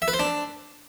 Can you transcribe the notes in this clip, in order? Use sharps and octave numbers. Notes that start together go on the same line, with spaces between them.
E5
B4
C5
D4